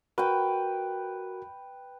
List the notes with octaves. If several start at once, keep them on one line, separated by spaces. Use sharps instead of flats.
F#4 A#4 B4 G5